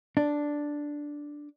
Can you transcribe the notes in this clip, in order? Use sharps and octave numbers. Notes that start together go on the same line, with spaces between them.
D4